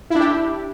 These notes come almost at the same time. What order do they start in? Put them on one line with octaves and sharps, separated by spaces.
E4 D4 G4